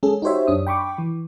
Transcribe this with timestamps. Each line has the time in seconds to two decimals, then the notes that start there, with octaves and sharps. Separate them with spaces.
0.03 G#3 C#4 G#4 A4
0.22 D#4 F#4 G4 C5 C#5 E5
0.47 F#2 D4 D#6
0.67 G5 B5 C#6 D6
0.98 E3